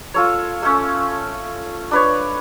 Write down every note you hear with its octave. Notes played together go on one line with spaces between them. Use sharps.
F4 A4 C#5
A3 C#4
D4 B4 C#5